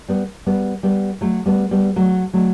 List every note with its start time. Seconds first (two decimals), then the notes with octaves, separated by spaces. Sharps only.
0.08 G3 B3
0.46 G3 B3
0.83 G3 B3
1.21 F#3 A3
1.46 G3 B3
1.71 G3 B3
1.96 F#3 A3
2.33 F#3 A3